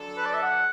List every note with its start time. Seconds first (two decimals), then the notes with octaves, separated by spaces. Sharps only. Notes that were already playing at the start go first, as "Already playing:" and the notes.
Already playing: D3 F#3 D4 A4
0.17 B4
0.26 D5
0.34 E5
0.42 F#5